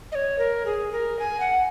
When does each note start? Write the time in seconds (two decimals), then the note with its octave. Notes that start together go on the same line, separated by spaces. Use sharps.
0.12 D#5
0.15 C#5
0.38 A#4
0.66 G#4
0.92 A#4
1.19 G#5
1.40 F#5